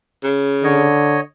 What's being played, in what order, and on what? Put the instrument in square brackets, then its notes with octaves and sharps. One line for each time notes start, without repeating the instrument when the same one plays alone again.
[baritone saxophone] C#3
[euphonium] D3 [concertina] C#5 D#5